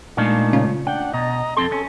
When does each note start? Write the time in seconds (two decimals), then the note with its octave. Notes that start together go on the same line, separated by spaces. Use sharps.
0.17 A#2 G#3 A3 D4 D#4 F5
0.53 C#3 C#4 F4
0.87 D4 F#5 G5
1.14 B2 D#5 A#5
1.57 F2 C4 A4 C6
1.72 C#4